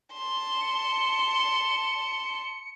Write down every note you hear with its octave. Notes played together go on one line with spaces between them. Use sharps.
A5 C6
C#7